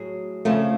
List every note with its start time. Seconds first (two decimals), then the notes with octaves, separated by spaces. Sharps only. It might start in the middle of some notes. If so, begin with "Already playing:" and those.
Already playing: A2 F#3 G#4
0.45 F2 C#3 F3 A3